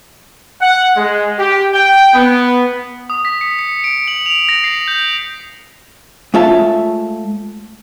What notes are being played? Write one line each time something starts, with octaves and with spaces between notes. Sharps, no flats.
F#5
G#3
G4
G5
B3
D#6
B6
C#7
C#7
D7
F#7
F7
A#6
C7
G6
G#3 A3 F4 C#5 E5 A5